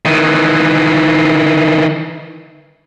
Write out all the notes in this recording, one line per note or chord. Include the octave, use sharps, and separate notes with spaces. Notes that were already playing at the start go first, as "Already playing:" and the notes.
D#3 E3